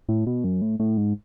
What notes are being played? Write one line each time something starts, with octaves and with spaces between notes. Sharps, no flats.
A2
B2
F#2
A2
A2
G#2